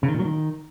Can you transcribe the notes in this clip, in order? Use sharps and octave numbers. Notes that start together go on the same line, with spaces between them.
C#3
D#3
A#2
F#3
D#3